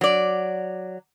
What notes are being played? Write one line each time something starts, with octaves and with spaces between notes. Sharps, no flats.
F#3 D5